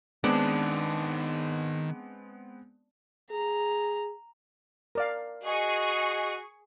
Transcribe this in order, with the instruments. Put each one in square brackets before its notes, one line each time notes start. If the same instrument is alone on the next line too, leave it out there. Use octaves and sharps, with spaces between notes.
[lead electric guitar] D#3 A5 [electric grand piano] G#3 B3 C4 [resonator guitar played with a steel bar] D4
[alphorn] G#4 [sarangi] A#5
[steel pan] A#4 D5 F5
[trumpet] F#4 [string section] G#4 C#6 [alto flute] D#5